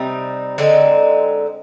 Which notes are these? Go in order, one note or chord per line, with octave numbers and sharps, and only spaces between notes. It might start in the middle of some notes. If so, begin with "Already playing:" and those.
Already playing: C3 G3 C4 D#4
D3 G#3 C4 D#4